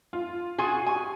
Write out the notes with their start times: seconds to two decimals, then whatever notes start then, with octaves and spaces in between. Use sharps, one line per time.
0.13 F4
0.58 F4 F#4 G#4 G#5
0.87 G4 G#5 C#6